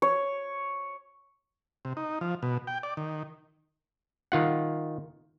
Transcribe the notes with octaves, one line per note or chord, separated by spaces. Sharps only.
C#5
C3
D#4
F3
B2
G5
D5
D#3
D#3 F4 F#5